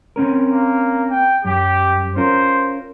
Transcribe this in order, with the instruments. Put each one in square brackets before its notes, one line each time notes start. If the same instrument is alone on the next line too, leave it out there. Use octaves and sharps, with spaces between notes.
[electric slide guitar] C4 C#4 A#4
[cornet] A#3
G5
[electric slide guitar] F#2 [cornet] G4
[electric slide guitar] C#4 F4 A#4 [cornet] C5